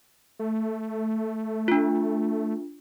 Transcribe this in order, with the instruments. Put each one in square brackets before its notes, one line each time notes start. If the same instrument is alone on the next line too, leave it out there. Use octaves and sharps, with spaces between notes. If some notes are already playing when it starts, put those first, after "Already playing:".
[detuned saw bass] A3
[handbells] D4 F4